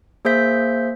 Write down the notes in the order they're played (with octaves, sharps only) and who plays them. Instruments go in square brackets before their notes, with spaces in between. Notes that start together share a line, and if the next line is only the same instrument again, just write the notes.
[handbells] A#3 G#4 C5 E5 G6 B6